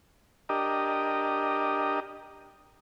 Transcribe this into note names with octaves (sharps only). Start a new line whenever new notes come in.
D4 G4 A#4 D#5